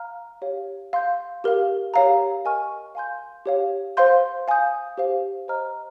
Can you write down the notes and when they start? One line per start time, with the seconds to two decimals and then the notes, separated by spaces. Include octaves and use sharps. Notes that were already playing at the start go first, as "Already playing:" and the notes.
Already playing: F5 A#5 F6
0.42 G4 C#5 F5
0.93 F5 C6 G6
1.44 G4 A#4 F5
1.94 G4 C#5 F5 A#5
2.45 A#4 D#5 G#5 C#6 F6
2.95 F5 G#5 C6 G6
3.46 G4 C#5 F5
3.97 C5 F5 C6 G6
4.48 F5 G#5 D#6 G6
4.98 G4 C5 F5
5.48 C5 D#5 A#5 F6